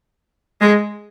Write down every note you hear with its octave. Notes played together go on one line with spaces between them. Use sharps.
G#3